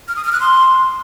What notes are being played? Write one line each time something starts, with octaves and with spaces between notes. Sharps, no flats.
F6
D#6
F6
F#6
C6